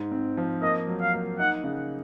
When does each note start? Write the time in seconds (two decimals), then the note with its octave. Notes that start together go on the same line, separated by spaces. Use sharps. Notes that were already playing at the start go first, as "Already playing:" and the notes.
Already playing: G#2
0.12 C4
0.37 F3
0.62 A#3 D#5
0.88 F#3
1.01 F5
1.14 A#3
1.39 D#4 F#5
1.64 C#3